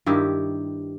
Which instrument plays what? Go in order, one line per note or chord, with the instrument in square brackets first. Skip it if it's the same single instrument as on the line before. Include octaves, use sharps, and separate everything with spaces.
[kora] G2 D#3 E4 G4